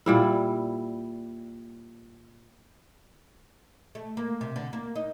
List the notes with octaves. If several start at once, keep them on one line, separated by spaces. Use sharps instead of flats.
A#2 G3 E4
A3
A#3
C3
D3
A#3
D#4